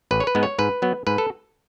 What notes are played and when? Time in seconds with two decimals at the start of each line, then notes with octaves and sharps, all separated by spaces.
0.11 A1 B4
0.20 C#5
0.27 B4
0.35 G#2 G#3 B3
0.43 C#5
0.59 G#2 B4
0.82 F#3 B3
1.07 G#2 B4
1.18 A4